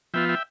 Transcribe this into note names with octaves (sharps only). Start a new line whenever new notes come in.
F3 B3 F4 E5 G5
E5 G5